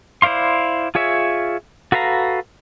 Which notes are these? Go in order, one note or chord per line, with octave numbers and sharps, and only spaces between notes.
E4 C5 D5 F5 C6
F4 G#4 C#5 E5
F#4 A4 B4 F5 A#5